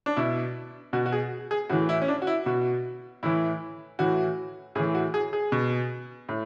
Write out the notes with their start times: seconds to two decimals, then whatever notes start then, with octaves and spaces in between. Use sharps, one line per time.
0.06 D4
0.16 B2 E4
0.93 B2 F#4
1.06 F#4
1.12 G#4
1.51 G#4
1.69 A2 E3 F#4
1.89 E4
2.02 C#4
2.08 D4
2.22 F#4
2.27 E4
2.46 B2 F#4
3.23 A2 E3 E4
3.99 A2 E3 F#4
4.75 A2 G#4
4.79 E3
4.95 F#4
5.14 G#4
5.33 G#4
5.52 B2
6.29 A2